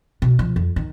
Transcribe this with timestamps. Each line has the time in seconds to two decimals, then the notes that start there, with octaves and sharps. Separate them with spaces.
0.22 B2
0.39 F3
0.56 F2
0.76 D#3